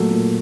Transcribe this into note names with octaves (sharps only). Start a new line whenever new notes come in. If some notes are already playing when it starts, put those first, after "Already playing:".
Already playing: A#2 F#3 A3
A#2